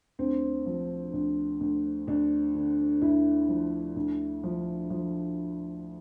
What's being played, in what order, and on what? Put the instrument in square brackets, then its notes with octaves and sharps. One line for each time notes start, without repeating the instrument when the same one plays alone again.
[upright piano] D2 C4
F3
D2
D2
D2 D4
D3
D2 E4
F3
D2
F3
F3